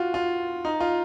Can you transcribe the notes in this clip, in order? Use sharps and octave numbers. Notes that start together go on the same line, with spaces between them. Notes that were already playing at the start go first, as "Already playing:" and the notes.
Already playing: F4 F#4
F4
D#4
F4